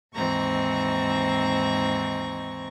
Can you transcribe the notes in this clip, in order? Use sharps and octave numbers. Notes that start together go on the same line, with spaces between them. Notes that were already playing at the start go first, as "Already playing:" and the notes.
D#2 G#2 E3 C4 A#5 C#6